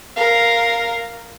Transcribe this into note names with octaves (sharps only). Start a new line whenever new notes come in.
A#4 F5